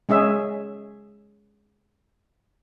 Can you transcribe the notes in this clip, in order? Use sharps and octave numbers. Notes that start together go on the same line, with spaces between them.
G#3 C#4 G#4 E5